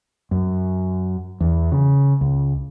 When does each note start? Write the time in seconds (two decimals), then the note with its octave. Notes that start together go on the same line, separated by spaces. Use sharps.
0.31 F#2
1.40 E2
1.72 C#3
2.21 C#2